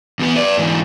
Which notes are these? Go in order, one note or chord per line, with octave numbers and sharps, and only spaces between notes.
E2 B3
B4 D5
G#2 E3